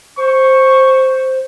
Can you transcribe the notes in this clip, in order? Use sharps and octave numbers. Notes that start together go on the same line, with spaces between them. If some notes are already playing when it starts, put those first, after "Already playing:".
C5 C#6